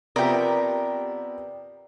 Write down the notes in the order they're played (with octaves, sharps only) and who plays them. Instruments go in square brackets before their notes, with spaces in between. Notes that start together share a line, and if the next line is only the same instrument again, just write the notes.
[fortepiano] C3 F3 [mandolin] B3 G4 [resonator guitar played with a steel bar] A#4 [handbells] D5 G5